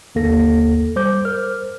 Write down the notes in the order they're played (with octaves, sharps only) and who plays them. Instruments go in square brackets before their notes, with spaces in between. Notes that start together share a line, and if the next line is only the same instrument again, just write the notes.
[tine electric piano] G1 D#2 A#3 A4 A#6
G3 C5 D6 G6
A#4 C5 F6